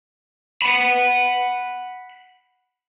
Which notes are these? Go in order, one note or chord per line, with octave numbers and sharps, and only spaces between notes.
F#5 B5